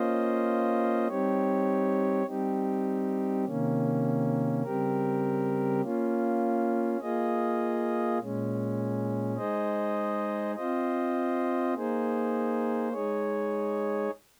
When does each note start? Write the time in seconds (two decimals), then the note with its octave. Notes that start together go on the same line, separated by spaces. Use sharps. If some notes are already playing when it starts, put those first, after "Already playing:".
Already playing: A#3 C#4 F4 C5 D#5
1.08 G3 C4 D#4 G4 C#5
2.27 G3 C4 D#4 G4
3.45 C3 D#3 A#3 C#4
4.63 C#3 G3 C4 G4 A#4
5.82 A#3 C#4 F4
7.00 A#3 F4 G#4 D#5
8.19 A#2 G#3 C#4
9.37 G#3 D#4 G#4 C5 D#5
10.56 C4 F4 C5 D#5
11.75 A#3 D#4 G#4 C5
12.93 G#3 D#4 G#4 C#5